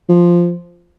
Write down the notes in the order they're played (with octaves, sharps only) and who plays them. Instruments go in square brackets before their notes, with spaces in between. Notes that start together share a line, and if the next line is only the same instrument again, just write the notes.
[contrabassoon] F3